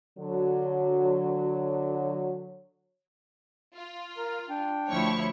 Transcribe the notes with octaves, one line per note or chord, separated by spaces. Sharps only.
D3 F#3
F4
A#4
D4 G5
D2 F3 E4 C#5 C#6